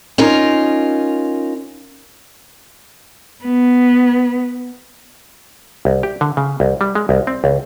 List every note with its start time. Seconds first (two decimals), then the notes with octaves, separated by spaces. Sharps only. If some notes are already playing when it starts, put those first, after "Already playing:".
0.18 C#4 D#4 F4 A#4
3.44 B3
5.85 C2
6.03 G4
6.21 D3
6.37 C#3
6.60 C2
6.81 G3
6.95 G#3
7.09 C2
7.27 C4
7.44 C#2